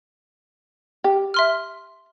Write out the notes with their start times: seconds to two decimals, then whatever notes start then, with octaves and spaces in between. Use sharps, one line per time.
1.04 G4
1.34 E5 C6 F6